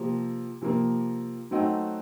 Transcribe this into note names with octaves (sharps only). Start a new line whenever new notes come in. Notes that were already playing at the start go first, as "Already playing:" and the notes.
Already playing: C3 F3 A#3
C3 F3 A#3
F#3 A3 C4 D#4 F#4